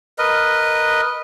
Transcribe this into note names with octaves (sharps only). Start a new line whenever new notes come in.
A#4 B4 D#5